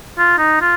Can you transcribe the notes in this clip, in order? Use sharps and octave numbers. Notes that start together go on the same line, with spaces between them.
F4
D#4
F4